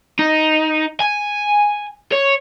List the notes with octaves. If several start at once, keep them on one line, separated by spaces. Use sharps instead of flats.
D#4
G#5
C#5